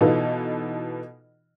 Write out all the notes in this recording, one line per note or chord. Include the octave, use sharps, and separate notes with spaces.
B2 E3 B3 D#4 F4 A4